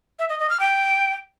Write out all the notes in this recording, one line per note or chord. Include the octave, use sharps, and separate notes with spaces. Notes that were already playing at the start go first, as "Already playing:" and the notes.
E5
D#5
D#5
F6
G5